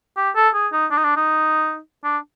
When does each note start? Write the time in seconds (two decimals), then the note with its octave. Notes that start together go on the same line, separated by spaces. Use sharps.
0.17 G4
0.36 A4
0.54 G#4
0.73 D#4
0.91 D4
0.98 D#4
1.04 D4
1.17 D#4
2.04 D4